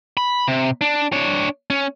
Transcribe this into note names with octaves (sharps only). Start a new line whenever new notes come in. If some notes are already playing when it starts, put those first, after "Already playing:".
B5
C3
D4
D4 C#5
C#4